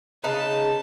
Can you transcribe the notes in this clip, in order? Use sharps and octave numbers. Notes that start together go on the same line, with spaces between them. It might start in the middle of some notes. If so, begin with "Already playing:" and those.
C#3 D#4 B4 A5